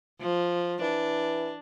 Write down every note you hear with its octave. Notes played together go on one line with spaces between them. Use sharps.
F3
E3 D4